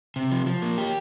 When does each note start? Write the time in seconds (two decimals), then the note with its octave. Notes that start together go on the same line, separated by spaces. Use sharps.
0.16 C3
0.31 F3
0.46 F3
0.62 A#3
0.78 G4